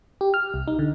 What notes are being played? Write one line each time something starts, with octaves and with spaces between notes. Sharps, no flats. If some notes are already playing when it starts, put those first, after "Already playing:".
G4
F6
C2
D#4
D3